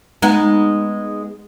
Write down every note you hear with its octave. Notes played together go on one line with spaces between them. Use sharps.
G#3 B3 D#4